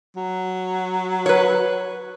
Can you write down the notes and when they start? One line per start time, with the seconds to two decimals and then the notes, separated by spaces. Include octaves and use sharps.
0.16 F#3
1.26 B4 C#5